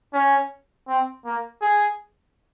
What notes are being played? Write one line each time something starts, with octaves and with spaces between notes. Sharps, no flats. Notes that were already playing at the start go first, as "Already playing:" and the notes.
C#4
C4
A#3
G#4